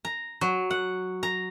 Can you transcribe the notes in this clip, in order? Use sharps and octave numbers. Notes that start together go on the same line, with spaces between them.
A#5
F#3
F#5
A#5